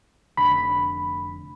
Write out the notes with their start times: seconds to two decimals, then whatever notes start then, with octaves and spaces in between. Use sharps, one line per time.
0.37 F1 D3 B5